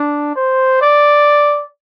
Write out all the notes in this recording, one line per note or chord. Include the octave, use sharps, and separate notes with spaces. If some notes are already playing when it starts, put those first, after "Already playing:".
Already playing: D4
C5
D5